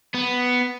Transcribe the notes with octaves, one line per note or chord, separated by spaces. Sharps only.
B3